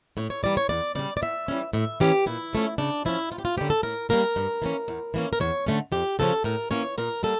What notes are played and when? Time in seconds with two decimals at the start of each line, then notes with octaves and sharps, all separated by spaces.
0.17 A2 C#5
0.30 C#5
0.43 E3 G3 A#3 D5
0.57 C#5
0.69 E2 D5
0.95 C#3 G3 D5
1.17 D5
1.22 E2 E5
1.48 E3 G3 C#4
1.73 A2 E5
2.00 E3 A#3 C#4 G4
2.26 A#2 E4
2.53 F3 A3 C#4
2.78 C#3 D4
3.05 F3 C#4 E4
3.31 G2 F4
3.38 G4
3.45 F4
3.57 D3 G3 A#3 C#4 G4
3.70 A4
3.83 A2 A#4
4.09 G3 A#3 C#4 A#4
4.36 G2
4.62 E3 A#3 C#4
4.88 E2
5.14 E3 A#3 C#4
5.33 A#4
5.40 E2 C#5
5.67 D3 A3 C#4
5.92 F2 G4
6.19 C#3 F3 C#4 A4
6.44 A2 A#4
6.71 E3 A#3 C#4 C#5
6.98 A#2 A#4
7.23 G3 A#3 A4